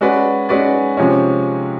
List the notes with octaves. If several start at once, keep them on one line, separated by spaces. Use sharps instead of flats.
G#3 C#4 F#4 B4 D5
G#3 C#4 F#4 B4 D5
C3 F3 G#3 C#4